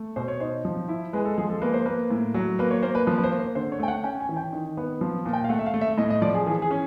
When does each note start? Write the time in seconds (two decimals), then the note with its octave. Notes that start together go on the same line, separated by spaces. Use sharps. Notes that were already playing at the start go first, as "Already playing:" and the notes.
Already playing: A3
0.16 B2 C5
0.28 C#5
0.40 D#4 C5
0.65 F3
0.89 E4
1.13 G#3 B4
1.25 A4
1.38 F3 G#4
1.50 A4
1.62 A#3 B4
1.74 C5
1.86 A#3 B4
2.10 A2
2.34 F#3
2.59 A#3 B4
2.71 C#5
2.83 A#3 C5
2.95 B4
3.07 F3 B4
3.18 B4
3.24 C5
3.31 A#3
3.39 C5
3.55 D3 C5
3.72 C#5
3.79 A3 G5
3.88 F#5
4.04 C#4 G5
4.20 G#5
4.29 E3
4.37 G5
4.53 D#3
4.77 B3
5.01 F3
5.25 A#2
5.33 G5
5.44 F5
5.49 A3 F#5
5.59 E5
5.66 F5
5.74 A3
5.81 E5
5.98 A2 D#5
6.10 D#5
6.22 F3 D5
6.34 G#4
6.46 E3 G#4
6.62 G#4
6.71 C#4